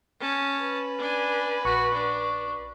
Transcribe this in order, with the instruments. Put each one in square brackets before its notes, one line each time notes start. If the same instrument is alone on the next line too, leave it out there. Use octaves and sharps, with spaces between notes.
[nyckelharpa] C#4 A5
[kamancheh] B4
[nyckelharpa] D4 G#5
[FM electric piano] A#1 C#6 [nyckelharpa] F#4
[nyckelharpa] D4